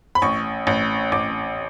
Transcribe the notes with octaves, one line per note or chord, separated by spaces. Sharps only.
B5
A1 C#6
A1
A1 D6